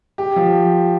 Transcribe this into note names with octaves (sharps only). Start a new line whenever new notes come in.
G4
F3